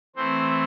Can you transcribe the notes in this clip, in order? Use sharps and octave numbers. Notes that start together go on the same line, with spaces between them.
E3 A3 C4 C5